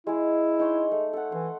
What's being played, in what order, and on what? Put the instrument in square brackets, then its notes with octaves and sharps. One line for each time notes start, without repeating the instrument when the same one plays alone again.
[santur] G#3 G#4 [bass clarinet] E4
[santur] D#4 C#5 C6
A3
A4 F#5
[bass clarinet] E3 [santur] C6